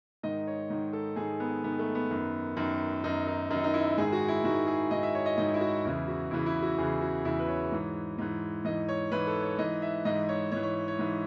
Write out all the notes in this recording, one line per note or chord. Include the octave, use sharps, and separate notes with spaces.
G#2 D#3 D#5
C#5
G#2 D#3
A4
G#2 D#3 G#4
B3
G#2 D#3 B3
A3
B3
F#2 D#3
F#2 D#3
F#2 D#3 D#4
D#4
F#2 D#3 D#4
D#4
E4
G#2 D#3 G#4
F#4
E4
G#2 D#3 F#4
G#4
G#2 D#3 D#5
E5
C#5
D#5
G#2 D#3 D#5
E4
F#4
E2 C#3 E3 E4
F#4
E2 C#3 E3 E4
E4
F#4
E2 C#3 E3 G#4
F#4
E2 C#3 E3 E4
B4
C#5
G#2 E3
G#2 E3
G#2 E3 D#5
C#5
G#2 E3 B4
A4
C#5
G#2 E3 D#5
E5
G#2 E3 D#5
C#5
G#2 E3 C#5
C#5
C#5
G#2 E3